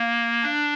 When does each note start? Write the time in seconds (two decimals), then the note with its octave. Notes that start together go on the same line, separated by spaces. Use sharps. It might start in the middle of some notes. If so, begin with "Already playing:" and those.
Already playing: A#3
0.43 D4